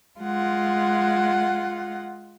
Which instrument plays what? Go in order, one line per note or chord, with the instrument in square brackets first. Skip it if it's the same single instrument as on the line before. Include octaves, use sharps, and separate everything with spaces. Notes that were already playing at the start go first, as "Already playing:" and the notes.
[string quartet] G#3 F4 F#5